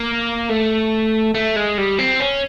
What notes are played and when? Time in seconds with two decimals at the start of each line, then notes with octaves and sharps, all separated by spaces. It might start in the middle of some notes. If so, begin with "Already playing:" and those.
Already playing: A#3
0.49 A3
1.35 A3
1.56 G#3
1.78 G3
1.98 C4
2.20 C#4